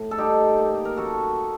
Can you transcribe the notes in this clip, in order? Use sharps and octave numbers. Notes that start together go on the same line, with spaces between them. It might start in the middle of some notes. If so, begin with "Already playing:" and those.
Already playing: A2
A4
G3 D#4 G4
A#3
A#4
F#2 F#4 A4